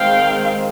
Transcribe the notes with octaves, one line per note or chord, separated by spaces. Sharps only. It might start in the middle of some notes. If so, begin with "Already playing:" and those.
Already playing: D#3 G#3 C4 F5 G5